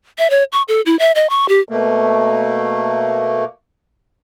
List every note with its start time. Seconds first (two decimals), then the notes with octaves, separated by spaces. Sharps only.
0.18 E5
0.30 C#5
0.52 C#6
0.68 A4
0.86 E4
0.99 E5
1.15 D#5
1.30 C#6
1.49 G4
1.69 B2 A3 A#3